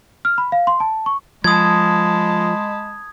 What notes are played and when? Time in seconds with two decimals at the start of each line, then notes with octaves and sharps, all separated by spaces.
0.25 F6
0.38 B5
0.52 F5
0.67 C6
0.80 A5
1.06 C#6
1.44 F3 G#3 A5 B5 D#6 G#6